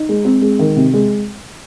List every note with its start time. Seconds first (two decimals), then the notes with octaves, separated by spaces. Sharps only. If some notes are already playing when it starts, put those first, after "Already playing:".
Already playing: D#4
0.09 G#3
0.25 C4
0.42 G#3
0.59 D#3
0.76 C3
0.94 G#3